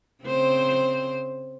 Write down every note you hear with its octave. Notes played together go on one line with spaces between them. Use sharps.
C#3 C4 C5